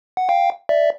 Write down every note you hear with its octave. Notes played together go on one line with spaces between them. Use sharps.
F#5
F5 G5
D5 E5